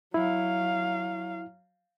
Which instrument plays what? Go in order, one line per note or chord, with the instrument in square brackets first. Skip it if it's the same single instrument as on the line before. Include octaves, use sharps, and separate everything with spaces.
[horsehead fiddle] F#3 F5 [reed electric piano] E4